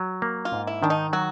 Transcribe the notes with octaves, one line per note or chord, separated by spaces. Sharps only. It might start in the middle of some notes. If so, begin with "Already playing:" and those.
Already playing: F#3
A#3
F4
G#2
E4
D#3 D4
D#4
F#3 F#4